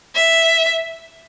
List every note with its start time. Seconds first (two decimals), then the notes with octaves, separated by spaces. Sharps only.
0.15 E5